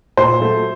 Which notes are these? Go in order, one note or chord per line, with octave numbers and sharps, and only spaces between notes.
A#2 C5
F#3 A3